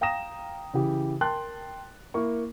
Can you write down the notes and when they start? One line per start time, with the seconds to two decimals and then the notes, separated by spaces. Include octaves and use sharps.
0.01 F5 G5 A#5 D#6 A#6 E7
0.74 C#3 E3 G4
1.21 A#4 G5 A5 C6 F#6 A6
2.14 A#3 E4 C#6